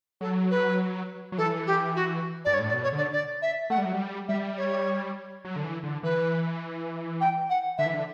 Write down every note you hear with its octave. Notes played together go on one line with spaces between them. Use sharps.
F#3 A4
B4
F#3
E3 A4
G4
F#4
G2 D5
C#5
A2
D5
B2
C#5
D3 D5
D5
E5
A3 F#5
G3
F#3
G3
G3 E5
C#5
F#3
D3
E3
D3
E3 B4
G5
F#5
D3 E5
E3
D3